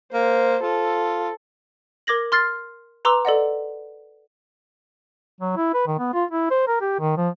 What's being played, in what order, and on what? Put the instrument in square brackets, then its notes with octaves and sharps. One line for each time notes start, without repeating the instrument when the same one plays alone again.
[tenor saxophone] A#3 [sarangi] C5
[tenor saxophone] F4 [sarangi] A4
[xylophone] A#4 D6 G#6 A#6 F#7
C6 F6 A6 C7
B4 A#5 C6 D6 E6
A4 D5 D#5 F#5
[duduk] F#3
E4
B4
D#3
B3
F4
E4
C5
A#4
G4
D#3
F3